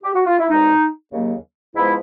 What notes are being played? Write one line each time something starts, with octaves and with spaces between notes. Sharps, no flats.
G4
F#4
F4
E4
C2 B2 G#3 D#4
D#2 C#3 F#3 A#3
G#2 F3 G#3 B3 E4